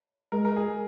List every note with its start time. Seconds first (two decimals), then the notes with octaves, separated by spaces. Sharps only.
0.32 G#3 A#4
0.45 A#4
0.56 G#4